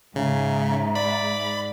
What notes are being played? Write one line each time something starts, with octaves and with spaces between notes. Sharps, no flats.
G#2 C#3 E5 A#5
D5 B5